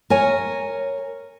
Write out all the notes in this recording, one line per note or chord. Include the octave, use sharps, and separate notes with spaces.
A#4 C#5 G#5